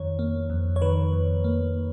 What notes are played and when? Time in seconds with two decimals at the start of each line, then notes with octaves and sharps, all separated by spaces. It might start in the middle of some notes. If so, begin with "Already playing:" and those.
Already playing: F2 D#3 C#5
0.19 A#3
0.50 F2
0.76 C#5
0.82 D#3 B4
1.13 F2
1.44 A#3